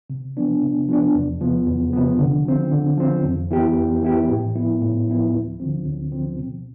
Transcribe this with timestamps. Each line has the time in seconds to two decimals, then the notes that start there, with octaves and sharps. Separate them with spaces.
0.10 C3
0.37 F3 B3 D4
0.62 C3
0.88 F3 B3 D4
1.15 E2
1.40 C3 F3 B3
1.67 E2
1.93 C3 F3 B3
2.19 D3
2.45 F3 C4
2.72 D3
2.97 F3 C4
3.24 F2
3.51 E3 B3 E4 G4
3.77 F2
4.02 E3 B3 E4 G4
4.29 A2
4.55 F3 B3 E4
4.82 A2
5.08 F3 B3 E4
5.33 D2
5.60 D3 F3 C4
5.85 D2
6.12 D3 F3 C4
6.38 B2